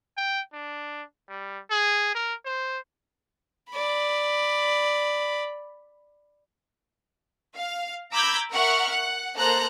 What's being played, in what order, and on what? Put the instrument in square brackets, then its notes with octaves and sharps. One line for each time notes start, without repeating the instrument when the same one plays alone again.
[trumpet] G5
D4
G3
G#4
A#4
C5
[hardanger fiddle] D5 B5
[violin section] F5
A#5 B5 D6 E6 G6 G#6
A#4 E5 F#5 C#6 F6
F#5
A#3 A4 C5 A#5 F#6